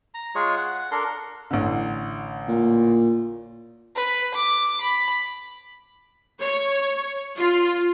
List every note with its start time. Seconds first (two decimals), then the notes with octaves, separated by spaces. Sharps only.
0.14 A#5
0.35 G#3 F4 G#4 C#5
0.57 F#5
0.92 D4 A4 A#4 C6
1.51 A1 D3
2.49 A#2
3.95 B4
4.34 D6
4.81 B5
6.40 C#5
7.37 F4